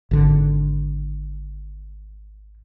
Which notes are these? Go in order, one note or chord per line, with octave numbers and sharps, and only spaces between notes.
G#1 D3